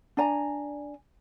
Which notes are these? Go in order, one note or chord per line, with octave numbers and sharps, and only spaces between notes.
D4 D5 G#5 A#5